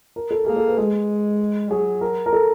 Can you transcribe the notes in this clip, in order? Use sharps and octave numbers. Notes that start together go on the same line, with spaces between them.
A#4
A4
A#3 G#4
A4
B4
G#3 G#4
F#3 G#4
A#4
A#4
A4